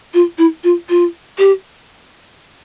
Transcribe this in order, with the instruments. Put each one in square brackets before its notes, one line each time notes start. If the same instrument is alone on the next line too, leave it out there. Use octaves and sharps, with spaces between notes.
[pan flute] F4
E4
F4
F4
G4